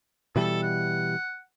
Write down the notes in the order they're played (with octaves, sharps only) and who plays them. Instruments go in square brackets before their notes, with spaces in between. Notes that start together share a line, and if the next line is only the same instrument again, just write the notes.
[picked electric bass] B2 E3 G3 [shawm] A4
[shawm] F#5